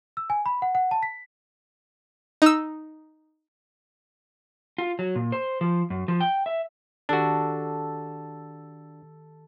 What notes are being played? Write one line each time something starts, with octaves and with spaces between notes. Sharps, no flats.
E6
G#5
B5
F#5
F#5
A5
B6
D#4 E6
F4
F#3
A#2
C5
F3
F#2
F3
G5
E5
D#3 D4 F#4 G4 A4